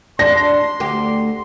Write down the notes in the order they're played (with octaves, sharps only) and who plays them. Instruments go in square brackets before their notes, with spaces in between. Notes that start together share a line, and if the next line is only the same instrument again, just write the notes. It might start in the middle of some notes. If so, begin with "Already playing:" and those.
[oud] D4 [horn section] C6 [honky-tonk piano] A#6
[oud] D2 G4